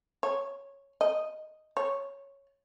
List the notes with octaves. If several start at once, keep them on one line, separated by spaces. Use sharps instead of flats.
C#5
D#5
C#5